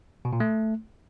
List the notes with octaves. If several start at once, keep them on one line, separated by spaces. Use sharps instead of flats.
B2
A#2
A3